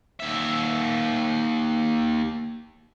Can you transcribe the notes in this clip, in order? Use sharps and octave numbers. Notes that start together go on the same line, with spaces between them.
D#2 E5